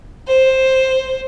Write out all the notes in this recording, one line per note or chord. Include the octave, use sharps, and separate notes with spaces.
C5